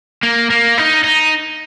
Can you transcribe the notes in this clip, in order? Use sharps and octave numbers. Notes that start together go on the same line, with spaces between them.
A#3
A#3
D#4
D#4